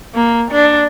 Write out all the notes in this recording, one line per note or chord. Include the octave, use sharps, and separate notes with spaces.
A#3
D4